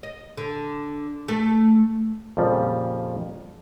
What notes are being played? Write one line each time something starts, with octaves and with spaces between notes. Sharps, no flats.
D#5
D3
A3
F2 A#2 C#3 F3 G3